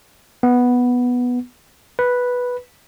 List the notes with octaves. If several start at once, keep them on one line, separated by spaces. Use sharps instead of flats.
B3
B4